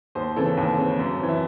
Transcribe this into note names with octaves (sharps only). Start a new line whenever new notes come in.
D#2 C5
C#3 E3 C4 A4
D#2
C#3 E3 C4
F#2
E3 C4
E4